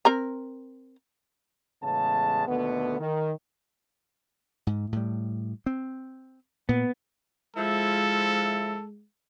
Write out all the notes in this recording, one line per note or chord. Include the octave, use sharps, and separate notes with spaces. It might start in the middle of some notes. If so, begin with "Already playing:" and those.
C4 A#4 A#5
A1 C#3 G#3 B3 A5
D#2 B2 D3 A3 B3
D#3
G#2
A2 G3
C4
A#2 B3
F3 G#3 E4 A4